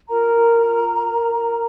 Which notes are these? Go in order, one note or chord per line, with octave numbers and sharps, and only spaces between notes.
F4 A#4 A#5
F4
F4
A#4
A#4
A#4